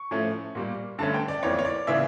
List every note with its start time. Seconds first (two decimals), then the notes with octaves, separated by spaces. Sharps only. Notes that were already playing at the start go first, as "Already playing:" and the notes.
Already playing: C#6
0.11 A2 F3 A3 C#4
0.55 A#2 G3 A#3
0.98 G2 D3 A3 C#4 A5
1.14 G5
1.28 D5
1.43 F2 E3 A#3 C#5
1.59 C#5
1.65 D5
1.87 C#3 E3 A#3 C#4 E5